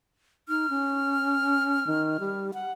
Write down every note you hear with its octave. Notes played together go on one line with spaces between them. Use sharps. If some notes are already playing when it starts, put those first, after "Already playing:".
D#4 F6
C#4
D#3
G3
F#5